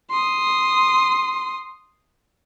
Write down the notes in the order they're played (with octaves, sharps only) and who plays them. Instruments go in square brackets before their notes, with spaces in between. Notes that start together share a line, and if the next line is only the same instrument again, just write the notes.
[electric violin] C6 D#6